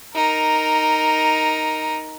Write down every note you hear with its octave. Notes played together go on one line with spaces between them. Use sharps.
D#4 A#4